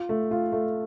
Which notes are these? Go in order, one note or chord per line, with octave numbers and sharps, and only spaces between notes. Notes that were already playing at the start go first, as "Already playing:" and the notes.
Already playing: F4
A3
F4
A3